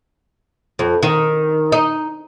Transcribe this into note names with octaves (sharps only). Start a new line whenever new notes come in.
F2
D#3
D#4